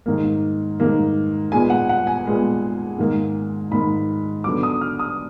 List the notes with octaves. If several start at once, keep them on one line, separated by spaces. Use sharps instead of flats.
G#2 D#3 A#3
G#2 D#3 A#3
A#2 G#3 B3 G#5
F#5
F#5
G#5
A#2 G#3 B3
G#2 D#3 A#3
G#2 D#3 A#3 B5
D3 F#3 B3 D6
D#6
F6
D#6